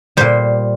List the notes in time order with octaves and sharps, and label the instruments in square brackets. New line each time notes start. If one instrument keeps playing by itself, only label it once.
[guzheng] A#2 G3 C5